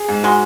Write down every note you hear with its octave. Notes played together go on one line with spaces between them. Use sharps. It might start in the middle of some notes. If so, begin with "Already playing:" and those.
Already playing: G#4
G#2
G#3 F#4